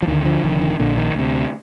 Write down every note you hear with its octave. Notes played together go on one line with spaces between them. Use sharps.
F3
D2 D3 D#3
D3 F3
F1 F2 D3 D#3
D#3
A#1 A#2 D3
D#3
D2 C3